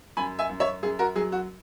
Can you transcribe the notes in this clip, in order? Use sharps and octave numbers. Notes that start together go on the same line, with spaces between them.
F#2 G#5 B5
E5 G#5
F#2
C#5 E5
F#2 G#4
F#4 A#4
F#3 G#4
F#4